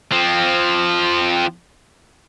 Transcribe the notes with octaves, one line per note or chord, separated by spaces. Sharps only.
F3 C4